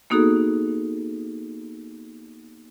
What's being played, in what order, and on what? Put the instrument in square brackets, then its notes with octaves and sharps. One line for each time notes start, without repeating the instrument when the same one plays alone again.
[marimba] A#3 B3 D#4 F#4 G#4 A4